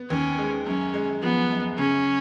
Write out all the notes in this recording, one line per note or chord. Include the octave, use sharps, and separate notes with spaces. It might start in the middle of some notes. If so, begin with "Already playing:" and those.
Already playing: B3
D#2 C#4
G#3
F#2 C#4
G#3
F3 B3
F#2
C#3 C#4